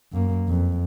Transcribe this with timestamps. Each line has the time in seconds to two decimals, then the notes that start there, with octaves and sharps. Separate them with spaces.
0.12 F#2 A#3
0.49 F2